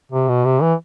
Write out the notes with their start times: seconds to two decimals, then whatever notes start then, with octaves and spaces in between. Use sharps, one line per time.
0.12 C3
0.28 B2
0.45 C3
0.62 E3